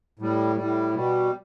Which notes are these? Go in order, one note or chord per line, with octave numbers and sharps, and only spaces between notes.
A2 G3
A2 G3
B2 G3